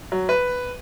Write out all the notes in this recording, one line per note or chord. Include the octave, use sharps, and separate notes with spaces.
F#3
B4